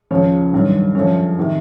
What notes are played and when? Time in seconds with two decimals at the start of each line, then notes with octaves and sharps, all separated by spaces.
0.11 C#2 C#3 F3 C#5
0.53 G2 D#3 F#3
0.95 F#2 D3 F3 C#5
1.39 C3 D#3